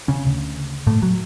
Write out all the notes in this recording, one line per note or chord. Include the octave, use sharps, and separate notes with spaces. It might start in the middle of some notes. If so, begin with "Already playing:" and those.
C#3 C#4
D2 C#3
A2 A3
F#3